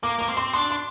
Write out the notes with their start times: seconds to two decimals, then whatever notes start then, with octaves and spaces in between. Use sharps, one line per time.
0.03 A#3 D6
0.19 A#3 D6
0.28 C4
0.37 C6
0.53 D4 C6
0.70 C6